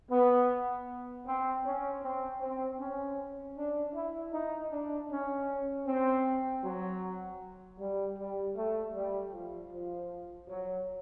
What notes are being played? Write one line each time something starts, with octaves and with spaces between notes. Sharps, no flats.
B3
C4
C#4
C4
C4
C#4
D4
E4
D#4
D4
C#4
C4
F#3
G3
G3
A3
G3
F3
F3
F#3